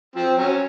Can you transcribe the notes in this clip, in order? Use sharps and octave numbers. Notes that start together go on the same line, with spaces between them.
F3 C4
F#3 C#4